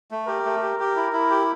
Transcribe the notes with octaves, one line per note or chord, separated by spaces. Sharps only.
A3
G4 A#4
A3
G4
G4
E4
E4
G4